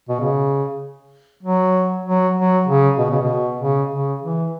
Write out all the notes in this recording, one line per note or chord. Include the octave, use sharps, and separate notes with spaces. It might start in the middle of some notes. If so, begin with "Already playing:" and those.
B2
C#3
F#3
F#3
F#3
C#3
B2
C#3
B2
C#3
C#3
E3